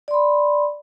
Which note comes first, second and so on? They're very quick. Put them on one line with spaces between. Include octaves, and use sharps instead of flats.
D5 C6 B5